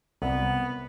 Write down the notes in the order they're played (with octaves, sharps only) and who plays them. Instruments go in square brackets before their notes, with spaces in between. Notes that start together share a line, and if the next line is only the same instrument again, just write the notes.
[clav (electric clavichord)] C2 [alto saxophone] B3